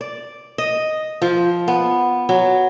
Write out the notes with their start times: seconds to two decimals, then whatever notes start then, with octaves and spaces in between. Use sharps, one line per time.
0.01 D5
0.58 D#5
1.22 F3
1.68 B3
2.29 F#3